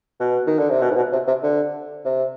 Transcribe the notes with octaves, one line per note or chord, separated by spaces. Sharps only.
B2
D#3
D3
C3
B2
G#2
B2
C3
C3
D3
C3